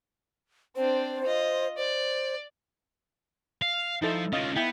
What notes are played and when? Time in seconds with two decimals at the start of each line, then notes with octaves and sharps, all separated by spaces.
0.76 C4 D4 C5
1.25 F4 D#5
1.77 C5 D5
3.62 F5
4.02 F3 D#4 E4 A4
4.33 C#4 F4 D#5 F5
4.56 B3 E4 G5